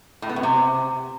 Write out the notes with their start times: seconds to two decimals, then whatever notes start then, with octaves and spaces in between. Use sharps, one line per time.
0.22 A2
0.29 B3
0.36 F#2
0.43 C3